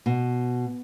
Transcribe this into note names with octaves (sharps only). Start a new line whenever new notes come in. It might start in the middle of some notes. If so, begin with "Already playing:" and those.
B2